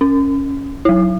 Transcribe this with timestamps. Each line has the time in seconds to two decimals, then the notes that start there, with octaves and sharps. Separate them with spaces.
0.01 C#4
0.85 F#3 E4